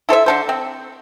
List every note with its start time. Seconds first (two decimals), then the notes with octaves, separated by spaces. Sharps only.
0.09 E4 A4 C5 E5
0.26 D3 A4 C5
0.49 C4